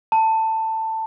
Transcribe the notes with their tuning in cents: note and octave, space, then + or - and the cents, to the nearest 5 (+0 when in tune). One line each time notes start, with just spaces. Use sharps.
A5 +15